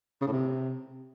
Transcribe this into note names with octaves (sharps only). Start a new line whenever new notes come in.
C#3
A2
C3